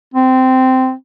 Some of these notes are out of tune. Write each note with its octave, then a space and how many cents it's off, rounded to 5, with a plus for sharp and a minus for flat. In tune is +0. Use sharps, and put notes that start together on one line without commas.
C4 -15